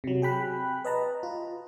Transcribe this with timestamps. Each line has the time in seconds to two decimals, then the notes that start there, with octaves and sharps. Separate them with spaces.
0.04 C3 F#3
0.22 G#4 G5 B5 F#6
0.85 B4 D#5 A5 A#5
1.23 F4